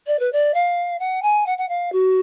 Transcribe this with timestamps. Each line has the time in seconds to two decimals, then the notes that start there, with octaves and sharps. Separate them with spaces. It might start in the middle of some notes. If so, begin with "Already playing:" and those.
0.07 D5
0.19 B4
0.32 D5
0.54 F5
0.99 F#5
1.22 G#5
1.46 F#5
1.58 F#5
1.68 F5
1.92 F#4